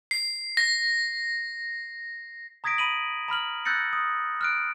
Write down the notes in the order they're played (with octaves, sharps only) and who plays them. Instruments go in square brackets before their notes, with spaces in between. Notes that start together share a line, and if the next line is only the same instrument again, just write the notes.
[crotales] C7
A#6
[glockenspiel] A#5 D#6 G#6 A#6 B6 D7
B5 D#7 F#7
A#5 B5 F6 F#7
E6 F#6 G6 A6 A#6 C#7
D#6
F6 F#6 D7